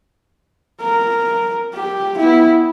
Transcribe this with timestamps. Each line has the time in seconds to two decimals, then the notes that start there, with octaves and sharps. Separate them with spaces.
0.80 A#4
1.73 G4
2.17 B3 E4